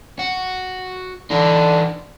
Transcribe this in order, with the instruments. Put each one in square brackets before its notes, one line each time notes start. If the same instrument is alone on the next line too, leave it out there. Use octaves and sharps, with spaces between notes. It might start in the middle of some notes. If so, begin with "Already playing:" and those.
[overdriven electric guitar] F#4
[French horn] D3 [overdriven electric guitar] E3 D#4